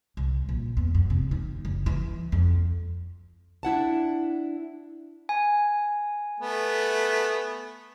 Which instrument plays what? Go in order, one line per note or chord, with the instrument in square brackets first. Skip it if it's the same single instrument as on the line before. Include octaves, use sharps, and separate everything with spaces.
[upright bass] C2
A#1
E2
F#2
C3
D#3
F#1
E3
F2
[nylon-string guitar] D4 E4 F#5 A5
[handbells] G#5
[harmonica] A3 B3